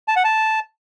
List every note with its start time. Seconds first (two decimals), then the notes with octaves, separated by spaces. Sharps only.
0.08 A5
0.16 F#5
0.24 A5